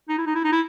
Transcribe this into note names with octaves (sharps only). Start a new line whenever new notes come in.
D#4
E4
D#4
E4
D#4
E4